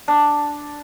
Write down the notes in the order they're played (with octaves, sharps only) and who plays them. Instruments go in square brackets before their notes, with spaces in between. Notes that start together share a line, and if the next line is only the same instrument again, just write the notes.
[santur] D4